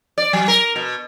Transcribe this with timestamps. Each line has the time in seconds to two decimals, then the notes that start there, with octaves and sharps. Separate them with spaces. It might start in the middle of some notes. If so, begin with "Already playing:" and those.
0.18 D5
0.33 F#3
0.48 A#4
0.76 B2